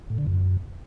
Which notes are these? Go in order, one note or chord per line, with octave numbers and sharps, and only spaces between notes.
A2
D3
F#2